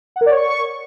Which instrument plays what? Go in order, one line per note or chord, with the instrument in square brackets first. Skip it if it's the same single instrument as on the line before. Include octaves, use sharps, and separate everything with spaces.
[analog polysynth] F#5
A#4
D5
C#5
C#6